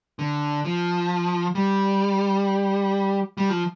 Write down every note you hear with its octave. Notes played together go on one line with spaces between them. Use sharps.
D3
F3
G3
G3
F3